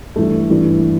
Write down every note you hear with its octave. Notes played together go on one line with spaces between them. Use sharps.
G2 E3 G3 A3
G2 E3 G3